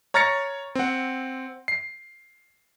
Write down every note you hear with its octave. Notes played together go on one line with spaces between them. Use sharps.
C#5 A#5 F6 A6 A#6 C#7
C4 F#5
C7